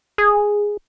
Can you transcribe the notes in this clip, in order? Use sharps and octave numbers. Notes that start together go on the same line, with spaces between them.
G#4